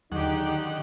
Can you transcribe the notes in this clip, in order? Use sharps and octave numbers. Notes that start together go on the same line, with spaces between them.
D#2 D3 D#3 F#3 D#4 G4 G#4 F#5